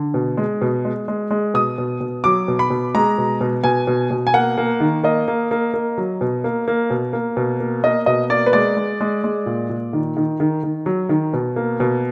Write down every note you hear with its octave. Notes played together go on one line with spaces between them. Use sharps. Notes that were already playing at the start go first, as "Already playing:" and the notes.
Already playing: D3
B2
G#3
B2
G#3
G#3
G#3
B2 D#6
B2
B2
F#3 D6
B2
B5
B2
G#3 A#5
B2
B2
B2 G#5
B2
B2
G#5
A#3 F#5
A#3
D#3
A#3 D#5
A#3
A#3
A#3
F#3
B2
A#3
A#3
B2
A#3
B2
A#3
A#3 D#5
B2 D#5
A#3 D5
B4
G#3 D5
G#3
G#3
G#3
A#2
A#2
D#3
D#3
D#3
D#3
F#3
D#3
B2
A#3
B2